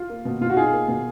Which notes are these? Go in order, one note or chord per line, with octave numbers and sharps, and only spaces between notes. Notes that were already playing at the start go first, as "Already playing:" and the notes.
Already playing: F4
A#3
B2
B2 F4
F#4
D#4 F4 G#4
A#3
B2